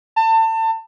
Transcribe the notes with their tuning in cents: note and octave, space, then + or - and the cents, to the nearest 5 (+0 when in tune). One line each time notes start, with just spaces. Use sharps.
A5 +30